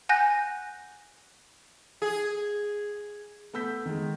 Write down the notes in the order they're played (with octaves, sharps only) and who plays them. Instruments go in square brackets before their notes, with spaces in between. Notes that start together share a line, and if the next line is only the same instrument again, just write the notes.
[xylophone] F#5 G#5 F#6 G6 A#6
[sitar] G#4
[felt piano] A3 B3 E6 G6 B6
D#3 G#3